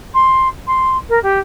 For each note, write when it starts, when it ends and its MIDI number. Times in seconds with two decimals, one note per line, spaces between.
0.14 0.48 84
0.67 0.97 84
1.09 1.19 70
1.23 1.39 67